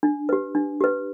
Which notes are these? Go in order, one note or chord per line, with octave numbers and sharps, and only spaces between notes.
D4
G4 B4
D4
G4 B4